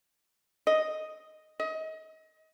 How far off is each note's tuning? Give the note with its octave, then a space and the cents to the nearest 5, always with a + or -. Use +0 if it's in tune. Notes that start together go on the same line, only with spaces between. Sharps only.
D#5 +0
D#5 +30